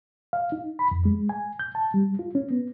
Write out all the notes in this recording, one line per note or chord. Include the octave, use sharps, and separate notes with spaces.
F5
D#4
B5
F2
G#3
G#5
G6
A5
G3
F4
C#4
B3